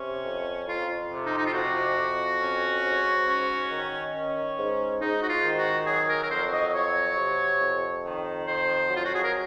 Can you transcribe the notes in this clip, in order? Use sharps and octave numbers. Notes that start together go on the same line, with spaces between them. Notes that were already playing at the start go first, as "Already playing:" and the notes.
Already playing: C3 C#4
F2
F2 F4
C3
D#4
D#4
F4
F2 F#4
F2
C#4
G#2
C#4
D#3
C#4
G#2
G#2 D#4
F#4
F4
D#3
F#4
F#3 G#4
A#4
A#4
F2 C5
D#5
F#3 C#5
C3
F2
D#3
F2 C5
F#3
F4
F#4
G#4
A#4